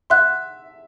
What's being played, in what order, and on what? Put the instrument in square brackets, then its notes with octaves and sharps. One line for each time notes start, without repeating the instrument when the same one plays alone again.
[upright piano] E5 [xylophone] F#5 C6 F#6